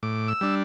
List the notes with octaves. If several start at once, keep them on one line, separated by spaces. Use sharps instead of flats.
A2 D6
E6
G3 D4